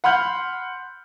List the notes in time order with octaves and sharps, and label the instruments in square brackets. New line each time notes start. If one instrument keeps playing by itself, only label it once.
[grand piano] F#5 B5 C6 F6 G6